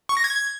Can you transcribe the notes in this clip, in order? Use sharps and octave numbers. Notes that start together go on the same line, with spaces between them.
C#6
A#6
G#6